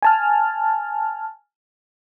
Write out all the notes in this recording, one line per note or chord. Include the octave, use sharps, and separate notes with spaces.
G#5 A5 F6